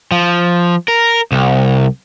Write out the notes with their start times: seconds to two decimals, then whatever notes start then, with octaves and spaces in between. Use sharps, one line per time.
0.11 F3
0.88 A#4
1.32 C2